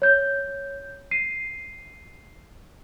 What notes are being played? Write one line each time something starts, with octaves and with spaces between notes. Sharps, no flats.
C#5 G6
C7 D#7